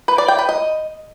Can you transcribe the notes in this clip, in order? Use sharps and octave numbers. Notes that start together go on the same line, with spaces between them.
B4
D5
G5
B4
D#5